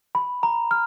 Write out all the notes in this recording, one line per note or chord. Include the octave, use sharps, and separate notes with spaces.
B5
A#5
F6